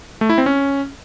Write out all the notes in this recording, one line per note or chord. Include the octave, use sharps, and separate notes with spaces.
A3
E4
C4
C#4